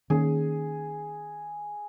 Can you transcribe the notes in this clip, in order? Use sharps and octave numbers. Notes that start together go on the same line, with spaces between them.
D#3 A#3 C#4 G#4